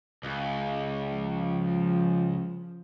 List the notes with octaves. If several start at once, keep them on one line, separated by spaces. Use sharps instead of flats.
C#2
F3